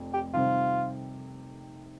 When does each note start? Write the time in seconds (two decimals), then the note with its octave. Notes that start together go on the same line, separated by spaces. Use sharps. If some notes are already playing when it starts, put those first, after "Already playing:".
Already playing: F1 F2
0.14 G4
0.33 C3 D#3 G3 C4 F4